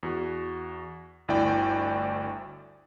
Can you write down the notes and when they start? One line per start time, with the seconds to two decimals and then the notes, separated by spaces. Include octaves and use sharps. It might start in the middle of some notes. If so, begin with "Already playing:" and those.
0.03 E2 F#4
1.28 G1 D2 E4 D5 G5